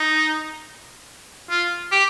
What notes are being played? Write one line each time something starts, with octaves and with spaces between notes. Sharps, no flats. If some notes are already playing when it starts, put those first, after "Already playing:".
Already playing: D#4
F4
G4